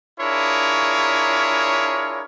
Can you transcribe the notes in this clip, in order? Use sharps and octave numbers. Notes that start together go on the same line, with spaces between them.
D4 E4 F4 G#4 A#4 C#5